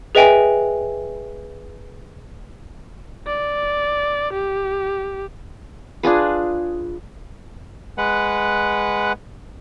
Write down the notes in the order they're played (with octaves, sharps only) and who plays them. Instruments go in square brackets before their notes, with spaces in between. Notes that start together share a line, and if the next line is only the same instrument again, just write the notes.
[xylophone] G#4 B4 D#5 E5 G5 G#5
[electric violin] D5
G4
[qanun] D4 F4 G#4 B4
[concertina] G#3 B4 F#5